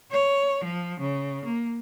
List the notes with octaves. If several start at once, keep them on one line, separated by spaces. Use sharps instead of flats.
C#5
F3
C#3
A#3